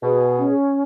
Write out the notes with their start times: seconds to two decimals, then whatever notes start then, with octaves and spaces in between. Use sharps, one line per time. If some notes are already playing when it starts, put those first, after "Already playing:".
0.02 B2 G#4
0.38 C#4